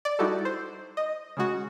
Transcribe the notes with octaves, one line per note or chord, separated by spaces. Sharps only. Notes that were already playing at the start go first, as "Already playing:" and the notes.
D5
G3 D#4 E4 F#4 G4 A4
C5
D#5
C#3 G#3 F#4